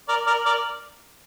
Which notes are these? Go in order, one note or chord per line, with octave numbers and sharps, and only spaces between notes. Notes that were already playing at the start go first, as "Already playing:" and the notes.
A#4 D5
A#4 D5
A#4 D5